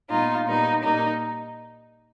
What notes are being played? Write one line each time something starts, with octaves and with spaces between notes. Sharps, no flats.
A#2 G3 B3 D#4 F4
A#2 G3 B3 D#4
A#2 G3 A#3 D#4